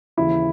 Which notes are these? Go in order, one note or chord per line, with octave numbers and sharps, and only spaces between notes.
D#2 C#3 E3 E4